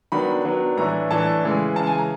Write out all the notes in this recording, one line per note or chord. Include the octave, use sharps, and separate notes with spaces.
D#3 F#3 B3 D4 B5
D#3 F#3 B3 D4
A2 E3 A3 D4 A#5
A2 E3 A3 D4 A5
C#3 E3 G#3
C#3 E3 G#3 A5
G#5
A#5